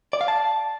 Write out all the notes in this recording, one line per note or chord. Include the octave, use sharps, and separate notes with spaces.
D5
F5
A5